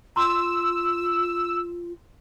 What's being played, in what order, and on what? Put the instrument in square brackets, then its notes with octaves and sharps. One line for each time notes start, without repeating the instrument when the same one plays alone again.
[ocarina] F4 [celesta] A#5 C6 [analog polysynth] E6